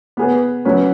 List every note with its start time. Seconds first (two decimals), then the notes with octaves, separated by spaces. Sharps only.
0.17 B3 G#4 B4
0.65 F#3 C#4 B4